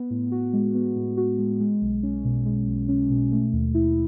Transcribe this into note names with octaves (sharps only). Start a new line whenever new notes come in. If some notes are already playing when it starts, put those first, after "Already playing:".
Already playing: B3
A2
F#4
G#3
B3
A2
F#4
G#3
G#3
B1
C#4
B2
G#3
B1
C#4
B2
A3
D#2
E4